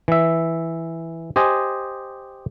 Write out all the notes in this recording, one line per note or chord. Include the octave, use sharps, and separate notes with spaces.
E3 E5
G4 C5 D#5 G#5